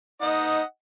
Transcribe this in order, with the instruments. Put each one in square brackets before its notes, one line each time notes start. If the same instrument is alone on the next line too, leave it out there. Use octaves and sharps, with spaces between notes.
[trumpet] D#4 [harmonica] D#5 F#5